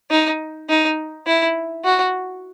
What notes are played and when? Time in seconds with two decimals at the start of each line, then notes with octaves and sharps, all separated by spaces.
0.11 D#4
0.69 D#4
1.27 E4
1.84 F#4